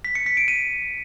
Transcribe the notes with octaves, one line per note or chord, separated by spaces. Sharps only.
B6
C#7
B6
D7
D#7